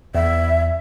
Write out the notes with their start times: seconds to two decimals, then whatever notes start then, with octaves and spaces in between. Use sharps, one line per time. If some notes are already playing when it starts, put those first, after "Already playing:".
0.15 E2 E5